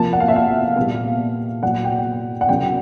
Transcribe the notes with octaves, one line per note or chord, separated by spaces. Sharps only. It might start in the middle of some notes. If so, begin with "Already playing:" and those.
Already playing: C3 F3 A#3 A5
F#5
F5
E5
F5
A#2 G3 B3 F5
A#2 F#3 B3 F#5
G5
F#5
C#3 F#3 A#3 G5